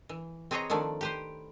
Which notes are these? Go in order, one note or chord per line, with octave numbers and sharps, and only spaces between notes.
E3
C4 G#4 B4 C#5 D#5 A#5
D#3 F3 A3 D4 D5
G4 B4 C5